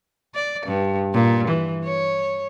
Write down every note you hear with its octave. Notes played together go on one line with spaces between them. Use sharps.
D5
G2
A#2
E3
C#5